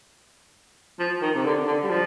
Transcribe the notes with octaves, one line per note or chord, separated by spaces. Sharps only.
F3
D#3
C3
D3
D3
G3
F3